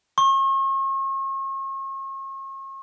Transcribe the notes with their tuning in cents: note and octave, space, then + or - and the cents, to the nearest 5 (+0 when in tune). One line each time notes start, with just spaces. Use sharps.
C#6 -40